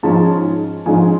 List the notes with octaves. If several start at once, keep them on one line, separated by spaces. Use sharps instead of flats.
G#2 F3 G#3 C#4 A5
G#2 F3 G#3 C#4 G#5